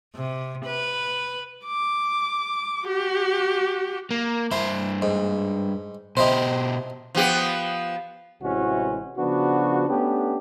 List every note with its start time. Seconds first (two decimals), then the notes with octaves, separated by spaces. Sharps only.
0.15 C3
0.66 B4
1.65 D6
2.86 F#4 G4
4.11 A#3
4.51 G2 E4 C5
5.02 G#2
6.17 B2 D#4 E4 G4 C5
7.15 F3 B3 G4
8.42 A1 C3 E3 G#3 C#4 F#4
9.18 C#3 F3 B3 D4 F#4
9.89 A3 B3 C#4 D4 G4